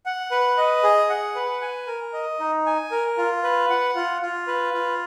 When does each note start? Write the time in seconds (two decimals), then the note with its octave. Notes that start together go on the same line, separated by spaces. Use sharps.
0.06 F#5
0.31 B4
0.57 D#5
0.84 G#4
1.10 F#5
1.35 B4
1.62 G#5
1.87 A#4
2.13 D#5
2.40 D#4
2.66 G#5
2.91 A#4
3.18 F4
3.44 B4
3.70 F#5
3.95 F4
4.22 F4
4.47 B4
4.73 F4